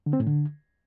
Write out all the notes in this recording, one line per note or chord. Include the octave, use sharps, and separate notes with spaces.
D3
C4
A2
D3